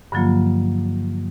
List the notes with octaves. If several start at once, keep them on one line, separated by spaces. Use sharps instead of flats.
G2 D3 F3 F#3 A#3 F4